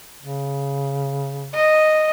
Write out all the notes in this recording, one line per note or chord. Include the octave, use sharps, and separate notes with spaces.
C#3
D#5